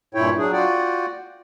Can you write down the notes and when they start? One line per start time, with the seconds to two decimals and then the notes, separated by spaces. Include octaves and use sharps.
0.14 G2 A#2 E4 C#5 G5
0.38 F#3 D4 G#4
0.53 F4 F#4 D5 F#5 G5